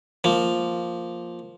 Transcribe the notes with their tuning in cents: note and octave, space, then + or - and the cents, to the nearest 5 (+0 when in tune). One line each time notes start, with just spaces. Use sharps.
F3 +0 A#3 +0